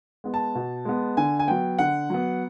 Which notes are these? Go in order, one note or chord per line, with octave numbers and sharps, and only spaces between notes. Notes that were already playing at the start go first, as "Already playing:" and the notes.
G#3 B3
A5
B2
G#3 B3
D3 G#5
G#5
F#3 B3 G5
D3 F#5
F#3 B3